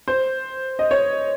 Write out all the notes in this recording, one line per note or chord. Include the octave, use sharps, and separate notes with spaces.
C5
D#5
C#5